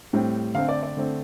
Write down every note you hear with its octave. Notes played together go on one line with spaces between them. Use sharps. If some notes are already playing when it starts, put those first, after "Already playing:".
A2 G3 C4
D3 A3 C4 F5
D5
D5
D3 A3 C4